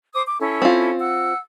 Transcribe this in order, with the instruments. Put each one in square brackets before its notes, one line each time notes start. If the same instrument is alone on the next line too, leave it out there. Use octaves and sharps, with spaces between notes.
[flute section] C5 D6 D#6
D6
C#4 E4 A4
[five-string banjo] C4 F4
[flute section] F#5 E6